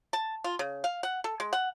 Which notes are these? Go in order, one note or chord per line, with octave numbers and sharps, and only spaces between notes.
A5
F4
C#3
F5
F#5
A4
G#3
F#5